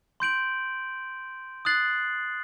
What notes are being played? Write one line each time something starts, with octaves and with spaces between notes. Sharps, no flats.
C6 G6 D7 F#7
D#6 F#6 A6 C7 F#7